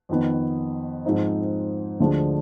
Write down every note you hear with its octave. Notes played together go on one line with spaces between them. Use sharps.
F2 D#3 B3
G#2 F3 C4 D#4
D2 D3 F3 G#3 D4